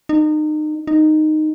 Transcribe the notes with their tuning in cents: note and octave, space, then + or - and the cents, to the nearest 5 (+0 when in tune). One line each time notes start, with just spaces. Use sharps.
D#4 -30
D#4 -10